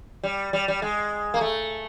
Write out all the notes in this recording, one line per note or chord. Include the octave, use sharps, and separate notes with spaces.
G3
G3
G3
G#3
A#3
A3